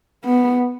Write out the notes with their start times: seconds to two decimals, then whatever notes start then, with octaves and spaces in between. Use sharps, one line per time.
0.25 B3